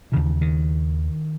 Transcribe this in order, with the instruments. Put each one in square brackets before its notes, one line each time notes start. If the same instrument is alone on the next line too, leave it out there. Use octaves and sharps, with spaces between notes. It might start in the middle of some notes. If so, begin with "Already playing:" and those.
[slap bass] D#2 C#3 E3
D#3